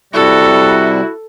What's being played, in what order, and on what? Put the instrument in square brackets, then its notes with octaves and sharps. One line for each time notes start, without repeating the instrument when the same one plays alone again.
[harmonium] C3 G3 [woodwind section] E4 F#4 [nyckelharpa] A4